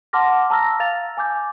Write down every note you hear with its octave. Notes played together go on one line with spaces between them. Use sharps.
F#5 A5 C6 D6 F6 A#6
A5 A#5 E6 F6 A#6
F5 A6 F7
G#5 D6 G6